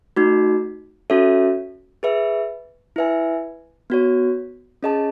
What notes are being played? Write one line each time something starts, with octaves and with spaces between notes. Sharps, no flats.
A3 D#4 F#4
C#4 F#4 A4 C#5 E5
G#4 B4 E5
E4 B4 E5 G#5
B3 F#4 C#5
C#4 G#4 D#5 A5